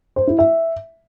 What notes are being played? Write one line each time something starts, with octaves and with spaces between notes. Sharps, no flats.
C5
E4
E5